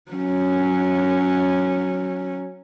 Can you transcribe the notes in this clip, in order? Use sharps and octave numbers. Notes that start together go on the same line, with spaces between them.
F#3 C#4